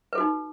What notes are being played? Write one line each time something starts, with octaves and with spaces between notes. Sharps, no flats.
D#4 F#4 A4 B4